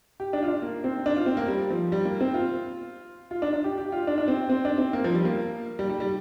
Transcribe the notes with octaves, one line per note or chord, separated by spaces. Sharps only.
G4
D4
F4
D4
A#3
C4
D4
F4
C4
A#3
G3
F3
G3
A#3
C4
F4
F4
D4
D4
G4
G4
F4
D4
D4
C4
C4
D4
C4
A#3
F3
G3
A#3
G3
G3
G3